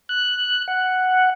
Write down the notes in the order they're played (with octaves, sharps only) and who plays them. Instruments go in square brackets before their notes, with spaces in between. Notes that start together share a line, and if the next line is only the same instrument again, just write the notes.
[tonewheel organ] F#6
F#5